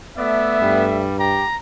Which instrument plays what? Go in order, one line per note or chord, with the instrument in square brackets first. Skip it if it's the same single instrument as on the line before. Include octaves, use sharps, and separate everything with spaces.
[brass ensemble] A3 E5 [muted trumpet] B3 [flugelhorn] D5
[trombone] G2 [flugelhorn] G3
[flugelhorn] G4 [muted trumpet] A#5